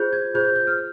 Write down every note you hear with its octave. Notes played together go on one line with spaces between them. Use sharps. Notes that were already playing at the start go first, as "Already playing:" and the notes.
Already playing: F4 G#4 C5 G6
G#6
F4 G#4 C5 G6
G6
G6
F6